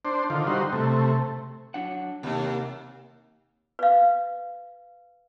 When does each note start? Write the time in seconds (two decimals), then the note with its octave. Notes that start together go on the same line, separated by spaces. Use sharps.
0.05 D4 C5
0.30 D3 D#3 F4
0.47 G3 D#4 F#4 C5
0.73 C3 A3
1.74 F#3 D4 F#5
2.23 D#2 C3 A#3
3.79 B4 F5